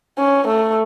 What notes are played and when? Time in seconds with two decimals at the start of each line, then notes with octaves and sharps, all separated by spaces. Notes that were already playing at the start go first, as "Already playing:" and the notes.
0.18 C#4
0.47 A3